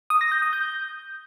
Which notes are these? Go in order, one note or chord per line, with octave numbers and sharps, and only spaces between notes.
D#6
A#6
G6
D#6
G6